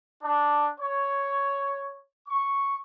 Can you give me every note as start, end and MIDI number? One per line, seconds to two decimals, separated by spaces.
0.22 0.70 62
0.78 1.97 73
2.27 2.75 85